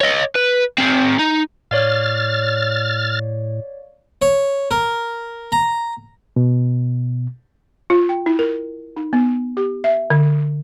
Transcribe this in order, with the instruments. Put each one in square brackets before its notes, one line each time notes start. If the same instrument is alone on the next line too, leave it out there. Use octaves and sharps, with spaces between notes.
[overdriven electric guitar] C#5 D#5
B4
C4 G#4
D#4
[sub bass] A2 [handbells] C#5 D5 F5 [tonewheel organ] F6 A6
[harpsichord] C#5
A#4
A#5
[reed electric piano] B2
[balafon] F4
G5
E4
A#4
D#4
B3
G4
E5
D3